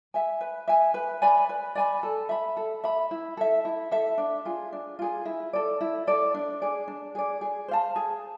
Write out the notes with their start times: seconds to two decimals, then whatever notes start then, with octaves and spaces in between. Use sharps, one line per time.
0.14 E5 G#5
0.41 B4
0.68 E5 G#5
0.94 B4
1.22 D5 G#5 B5
1.49 B4
1.75 D5 G#5 B5
2.03 A4
2.29 E5 B5
2.57 A4
2.84 E5 B5
3.11 E4
3.37 A4 E5
3.65 E4
3.91 A4 E5
4.18 D4
4.45 F4 G#4
4.72 D4
4.99 F4 G#4
5.25 E4
5.53 A4 D5
5.81 E4
6.07 A4 D5
6.34 D4
6.61 G#4 D5
6.88 D4
7.15 G#4 D5
7.41 G#4
7.68 C5 F5 A5
7.96 G#4